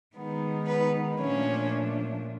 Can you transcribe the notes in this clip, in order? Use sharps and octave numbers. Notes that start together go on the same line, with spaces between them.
D#3 G#3 B3 D#4
B3 B4
A#2 F3 A3 C#4 D4 C#5